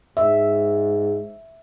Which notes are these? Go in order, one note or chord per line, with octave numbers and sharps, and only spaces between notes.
G#2 E5